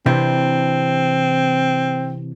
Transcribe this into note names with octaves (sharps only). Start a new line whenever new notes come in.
C3 E3 C4 D4